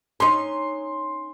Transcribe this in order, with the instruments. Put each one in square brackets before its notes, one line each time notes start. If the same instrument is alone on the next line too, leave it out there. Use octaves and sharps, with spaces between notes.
[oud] C#4 D#4 [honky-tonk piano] C6